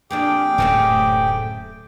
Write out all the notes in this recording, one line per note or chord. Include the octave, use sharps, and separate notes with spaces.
F2 A#3 D4 G4 G#4 G5 D6
D1 F#2 A#2 A3 C4 C#4